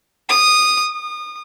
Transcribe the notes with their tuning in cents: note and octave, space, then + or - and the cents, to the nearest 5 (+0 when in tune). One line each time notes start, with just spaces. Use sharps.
D#6 -15
D#6 -30